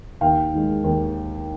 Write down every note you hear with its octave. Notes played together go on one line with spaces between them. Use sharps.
D#2 F5 G5
D#3 G#3
D#2